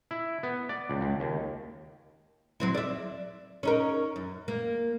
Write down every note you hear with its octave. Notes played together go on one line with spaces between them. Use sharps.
E4
B3
D5
C#2
C#2
D#2
F#3 C4 E4
D5 E5
C#4 D#4 A#4
F#2
A#3